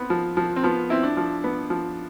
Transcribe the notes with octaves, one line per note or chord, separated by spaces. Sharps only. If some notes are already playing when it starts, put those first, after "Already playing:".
Already playing: B3 C4
F3
F3
C4
F3 B3
C4 E4
D4
F3
B3
F3